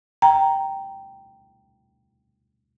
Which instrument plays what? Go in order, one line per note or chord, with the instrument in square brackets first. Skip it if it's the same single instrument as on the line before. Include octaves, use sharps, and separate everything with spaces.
[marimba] G5 A#5